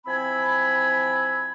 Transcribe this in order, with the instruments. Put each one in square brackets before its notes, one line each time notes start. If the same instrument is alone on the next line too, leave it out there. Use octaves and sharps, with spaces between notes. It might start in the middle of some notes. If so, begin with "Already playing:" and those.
[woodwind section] F3 C4 E4 G#5 B5